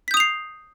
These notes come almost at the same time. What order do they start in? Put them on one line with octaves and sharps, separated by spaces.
B6 G6 D#6 F7 C7